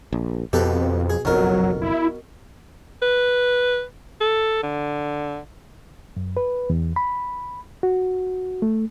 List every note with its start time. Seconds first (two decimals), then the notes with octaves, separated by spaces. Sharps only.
0.13 A#1
0.53 F2 B2 G4 A4 B4
1.10 G#4
1.25 F#1 B1 F2 B2 F#3 A#4
1.81 E4
3.03 B4
4.21 A4
4.63 D3
6.17 F#2
6.37 B4
6.70 E2
6.96 B5
7.83 F#4
8.62 A3